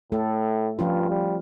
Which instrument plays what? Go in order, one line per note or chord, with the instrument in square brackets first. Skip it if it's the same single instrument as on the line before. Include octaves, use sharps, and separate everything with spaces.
[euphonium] A2 [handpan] A3 A4
[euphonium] G2 [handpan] F3 C#4 F4
[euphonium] G3